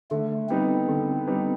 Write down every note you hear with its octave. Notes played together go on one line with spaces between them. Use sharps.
D3 A3
G3 B3 C4 D#4
D3
G3 B3 D#4